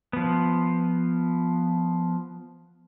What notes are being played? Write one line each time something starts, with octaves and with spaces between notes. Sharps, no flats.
F3 B3